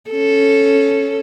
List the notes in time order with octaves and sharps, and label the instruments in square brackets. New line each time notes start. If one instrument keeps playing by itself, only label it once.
[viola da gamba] C#4 A4